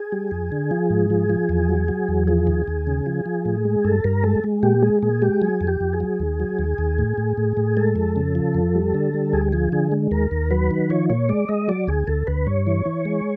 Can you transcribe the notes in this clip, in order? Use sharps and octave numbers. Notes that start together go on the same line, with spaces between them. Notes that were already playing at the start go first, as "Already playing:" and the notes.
Already playing: G#4
G3
F2
D3
F3
G#2
F3
F3
E2
F#3
F#3
E2
F3 G#4
D#2
D#2
C#3
F3
F3
A2
G#3
G2 A4
G2 A#4
G#3 A4
G#3
A#2 G4
G#3 G#4
A#2 G#4
G#3 G4
F#3 G#4
F2
G4
F2
G#4
F#3
D#2
F#3
D#2
D#2
A2
A2
A2
A2
G#3 A4
F2
C#3
F3
F2
G3
D3
G3
D2 G#4
F3 G#4
D3 G#4
G#3
D#2 A#4
D#2
F#3 B4
D#3
F3 C#5
A#2 C#5
G#3 D5
G#3 D#5
F#3 D5
D2 G#4
D2 A4
D2 B4
G2 C#5
E3
E3
G#3